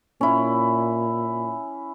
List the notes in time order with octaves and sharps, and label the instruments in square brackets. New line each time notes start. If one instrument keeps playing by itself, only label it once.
[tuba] A#2 [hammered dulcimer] C#4 E4